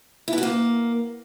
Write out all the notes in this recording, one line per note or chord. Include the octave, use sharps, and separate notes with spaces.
E4
B4
F#4
A#3